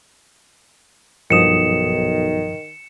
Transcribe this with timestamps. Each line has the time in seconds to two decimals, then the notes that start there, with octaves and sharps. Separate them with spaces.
1.30 B1 G2 D#3 F3 D#6 C#7 E7